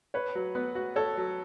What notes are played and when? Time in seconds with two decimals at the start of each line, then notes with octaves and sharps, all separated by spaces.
0.14 B4 C#5
0.35 F#3
0.55 B3
0.75 F#4
0.96 A4 C#5
1.18 F#3